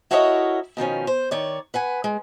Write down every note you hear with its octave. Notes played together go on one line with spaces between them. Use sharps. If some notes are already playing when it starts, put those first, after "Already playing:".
E4 F#4 A4 A#4 C#5 D#5
B2 D#3 F3 C#4
C5
D#3 C#5 D5
B4 F#5 G#5
G#3